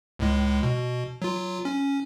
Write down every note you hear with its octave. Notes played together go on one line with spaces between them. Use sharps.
C#2 A2 G#3
B2
F#3 F4
C#4